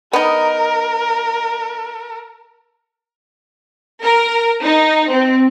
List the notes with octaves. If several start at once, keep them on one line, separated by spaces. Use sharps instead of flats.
B3 D#4 A#4
A#4
D#4
C4